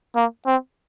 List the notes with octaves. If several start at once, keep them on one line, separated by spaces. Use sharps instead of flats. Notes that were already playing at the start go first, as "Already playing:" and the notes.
A#3
C4